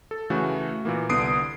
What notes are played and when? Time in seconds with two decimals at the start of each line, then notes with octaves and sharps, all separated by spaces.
0.11 A4
0.30 C#3 E3 A3 F#4
0.85 A#2 E3 A#3
1.09 C2 D3 B3 D#6 C7 D7